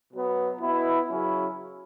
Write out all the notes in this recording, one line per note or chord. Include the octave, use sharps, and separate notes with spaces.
B2 F#3 B3
B2 B3 E4
C#3 F#3 C#4 E4